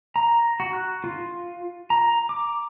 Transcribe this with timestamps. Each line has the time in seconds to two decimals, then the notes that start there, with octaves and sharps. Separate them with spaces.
0.16 A#5
0.60 F#4
0.73 F#6
1.04 F4
1.90 A#5
2.29 D6